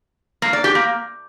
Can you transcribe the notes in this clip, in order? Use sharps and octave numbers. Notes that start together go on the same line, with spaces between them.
A#3
D5
G4
A#3